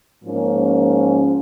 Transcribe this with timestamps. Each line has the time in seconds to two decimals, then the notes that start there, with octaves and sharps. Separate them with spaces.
0.22 G#2 F3 A#3 C#4